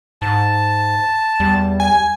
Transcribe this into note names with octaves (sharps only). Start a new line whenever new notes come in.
G#2 A5
E2 G3
G#5